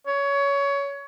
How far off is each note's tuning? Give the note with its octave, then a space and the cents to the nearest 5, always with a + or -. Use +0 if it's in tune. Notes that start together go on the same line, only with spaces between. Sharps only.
C#5 +20